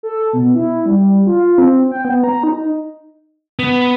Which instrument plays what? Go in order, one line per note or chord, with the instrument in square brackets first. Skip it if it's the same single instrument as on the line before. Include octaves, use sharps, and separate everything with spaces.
[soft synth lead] A4
B2
E4
G3
F4
C4
G5
B3
A#5
D#4
[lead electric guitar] B3